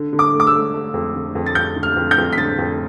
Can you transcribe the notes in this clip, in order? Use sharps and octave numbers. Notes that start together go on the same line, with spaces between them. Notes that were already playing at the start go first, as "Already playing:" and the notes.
Already playing: D3
D3
D6
A3
D6
E6
A3
A3
F2
D3
F2
A6
F2 G6
D3
F6
F2
G6
F2
B6
D3 A6
F2